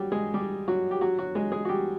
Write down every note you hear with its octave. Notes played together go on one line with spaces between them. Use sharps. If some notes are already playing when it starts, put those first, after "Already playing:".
Already playing: F#3 G3 F#4 G4
G#3 G#4
G3 G4
F#3 F#4
G4
F#3 F#4
F#3 F#4
G#3 G#4
G#3 G#4
F#4
G3 G4